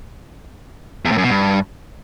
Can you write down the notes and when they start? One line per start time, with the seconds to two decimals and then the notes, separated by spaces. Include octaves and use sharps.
1.05 E2
1.11 A2
1.18 F#2
1.24 B2
1.30 G2